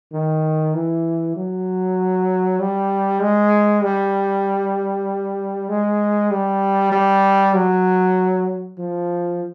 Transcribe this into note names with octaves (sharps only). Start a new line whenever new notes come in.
D#3
E3
F#3
G3
G#3
G3
G#3
G3
G3
F#3
F3